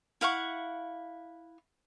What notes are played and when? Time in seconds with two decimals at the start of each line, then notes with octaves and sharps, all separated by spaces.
0.21 E4 F5 F#5 C#6